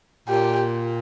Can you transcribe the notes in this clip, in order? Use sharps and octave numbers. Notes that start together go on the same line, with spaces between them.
A#2 G4